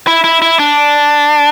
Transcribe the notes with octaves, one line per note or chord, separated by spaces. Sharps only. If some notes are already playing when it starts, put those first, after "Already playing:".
E4
E4
E4
D4